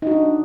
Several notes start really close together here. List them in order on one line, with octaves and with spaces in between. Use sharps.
D#4 F#4 D4